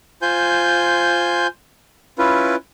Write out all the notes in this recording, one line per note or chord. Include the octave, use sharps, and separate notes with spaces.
F4 C5 G#5 G6
C#4 E4 F4 B4